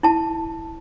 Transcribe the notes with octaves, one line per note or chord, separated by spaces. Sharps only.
E4 A5